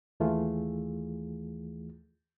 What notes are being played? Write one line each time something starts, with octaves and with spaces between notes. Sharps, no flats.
D#2 E3 A3 F4 G#4